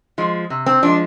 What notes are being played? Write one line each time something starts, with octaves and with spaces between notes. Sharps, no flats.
F3 G#3
C3
C4
F3 G#3 D4